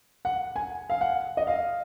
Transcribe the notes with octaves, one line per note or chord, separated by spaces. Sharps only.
F#5
G#5
F5
F#5
D#5
F5